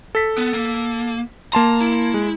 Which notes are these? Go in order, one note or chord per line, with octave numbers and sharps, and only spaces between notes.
A4 B6
B3
A#3
A#3 A5 A#5 C6
E4
G#3